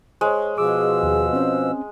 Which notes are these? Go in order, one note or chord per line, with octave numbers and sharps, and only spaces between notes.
G#3 C5 C#5
B2 F3 G#4 D6 E6
D#2
C4 C#4 C5